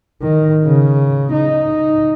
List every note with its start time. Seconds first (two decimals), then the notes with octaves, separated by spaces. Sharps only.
0.22 D#3
0.65 C#3
1.32 D#4